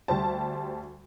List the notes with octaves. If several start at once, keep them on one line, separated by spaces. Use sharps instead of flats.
D2 G3 C5 A5